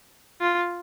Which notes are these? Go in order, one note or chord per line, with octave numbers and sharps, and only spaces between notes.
F4